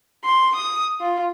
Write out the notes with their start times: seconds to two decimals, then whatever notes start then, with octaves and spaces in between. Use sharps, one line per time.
0.24 C6
0.55 D#6
1.01 F4